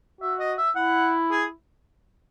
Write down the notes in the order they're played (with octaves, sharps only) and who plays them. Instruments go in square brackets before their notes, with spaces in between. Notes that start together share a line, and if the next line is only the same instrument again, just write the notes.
[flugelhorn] F#4 [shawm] E5
[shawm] D#5
E5
[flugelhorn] E4 [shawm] F#5
[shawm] G#4